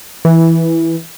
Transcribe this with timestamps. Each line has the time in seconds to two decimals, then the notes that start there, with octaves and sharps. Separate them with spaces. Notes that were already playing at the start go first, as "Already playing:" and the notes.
0.25 E3